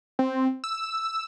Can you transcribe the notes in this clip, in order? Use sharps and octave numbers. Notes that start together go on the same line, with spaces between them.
C4
E6